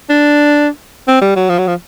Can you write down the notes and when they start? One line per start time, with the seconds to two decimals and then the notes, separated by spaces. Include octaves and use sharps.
0.10 D4
1.08 C4
1.22 G3
1.36 F#3
1.49 F3
1.58 F#3
1.67 F3